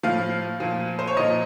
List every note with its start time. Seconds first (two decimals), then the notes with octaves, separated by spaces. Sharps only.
0.03 A2 F3 F5
0.60 A#2 F3
0.99 C5
1.07 C#5
1.16 A#2 F3 D#5